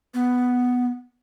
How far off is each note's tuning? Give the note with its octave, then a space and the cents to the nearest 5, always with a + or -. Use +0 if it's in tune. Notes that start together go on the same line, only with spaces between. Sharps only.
B3 +5